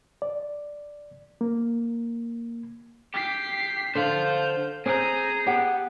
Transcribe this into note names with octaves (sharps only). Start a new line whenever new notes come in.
D5
A#3
G4 B6 C7
D3 C5 F5 G6
C4 G#4 A#5 G6
B3 G4 F#5 G5